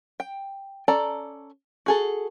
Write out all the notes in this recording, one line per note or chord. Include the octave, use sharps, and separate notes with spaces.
G5
C#4 A4 D5 A5 A#5
F#4 G#4 A4